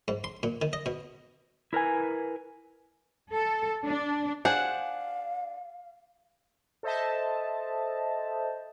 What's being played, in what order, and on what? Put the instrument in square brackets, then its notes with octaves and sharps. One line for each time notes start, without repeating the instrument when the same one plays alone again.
[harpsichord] G#2
C6
A#2
D#3
D#5
B2
[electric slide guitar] E4 A#4 B4 G#5
[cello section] A4
D4
[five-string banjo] D4 G#4 C5 [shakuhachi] F5 [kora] F#5
[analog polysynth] A4 C5 D#5 E5 A5